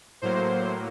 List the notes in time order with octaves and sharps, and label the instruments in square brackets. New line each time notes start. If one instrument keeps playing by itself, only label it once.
[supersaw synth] A2 F#3 A#3 C5